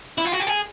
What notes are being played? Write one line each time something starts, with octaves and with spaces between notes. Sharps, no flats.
E4
F4
F#4
G4
G#4